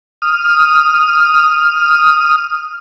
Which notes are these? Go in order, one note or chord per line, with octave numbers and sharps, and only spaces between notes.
D#6 F6